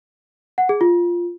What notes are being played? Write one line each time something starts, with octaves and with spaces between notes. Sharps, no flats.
F#5
G#4
F4